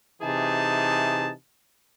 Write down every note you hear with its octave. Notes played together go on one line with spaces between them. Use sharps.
C3 E3 D#4 G#4 A5